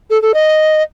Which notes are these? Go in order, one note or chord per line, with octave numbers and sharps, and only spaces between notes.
A4
A4
D#5